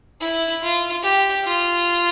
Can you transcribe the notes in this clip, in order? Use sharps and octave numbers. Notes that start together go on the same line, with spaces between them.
E4
F4
G4
F4